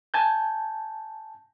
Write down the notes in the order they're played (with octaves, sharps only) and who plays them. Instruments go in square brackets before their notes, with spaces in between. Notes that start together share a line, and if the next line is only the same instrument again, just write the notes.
[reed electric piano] G#5 A5 G6